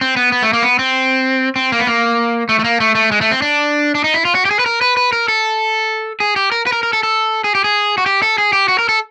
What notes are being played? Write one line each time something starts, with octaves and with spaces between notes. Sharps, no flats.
C4
B3
B3
A3
A#3
B3
C4
C4
A#3
B3
A#3
A3
A3
A#3
A3
A3
G#3
A3
C4
D4
D4
D#4
E4
F4
F#4
G4
G#4
B4
A#4
B4
B4
A#4
A4
G#4
G4
A#4
B4
A#4
A#4
A4
A4
G#4
G4
G#4
F#4
G4
A4
G#4
G4
F#4
A#4
A4